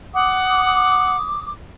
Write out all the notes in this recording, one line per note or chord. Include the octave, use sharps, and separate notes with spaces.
F#5 D6 D#6